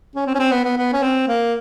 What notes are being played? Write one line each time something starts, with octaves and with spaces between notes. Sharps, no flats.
C#4
C4
C#4
C4
B3
B3
B3
C#4
C4
A#3